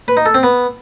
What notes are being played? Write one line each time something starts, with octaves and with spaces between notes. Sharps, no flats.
B4
D#4
A4
C4
B3